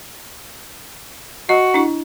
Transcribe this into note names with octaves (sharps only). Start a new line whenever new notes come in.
F#4 D#5
D4 E4